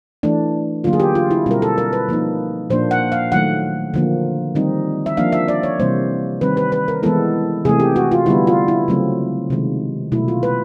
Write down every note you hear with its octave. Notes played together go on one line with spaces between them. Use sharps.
E3 A3 D4
D3 F#3 A#3 F4
G#4
G4
F4
E4
B2 G3 C4 E4 A#4
A4
A#4
B4
F3 A#3 D#4
A#2 F3 A#3 D4 C5
F#5
F5
D#3 F#3 A3 F#5
D3 F3 A#3
D#3 G3 C4 D#4
E5
F3 A#3 D4 F5
E5
D5
C#5
C3 E3 G3 A#3 C5
D#3 G3 C4 B4
B4
B4
A#4
E3 G#3 B3 E4 A4
C3 E3 A3 G#4
G4
F#4
F4
D3 G3 B3 E4
F4
E4
C#3 F#3 A3 C4
C3 D#3 G#3
B2 F#3 A3 E4
F4
B4